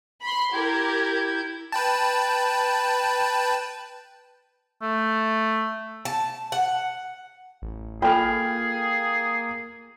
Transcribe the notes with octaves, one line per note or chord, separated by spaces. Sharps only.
B5 C6
E4 G4 A#4 G6 G#6
B4 G5 A5
A3
A5
F#5
A1
A#3 F4 G#4 A4 G5 G#5 B5 F6